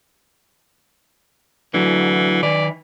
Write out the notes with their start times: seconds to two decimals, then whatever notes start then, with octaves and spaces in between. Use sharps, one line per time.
1.74 D3 E3 F#3
2.43 D#3 B4 D5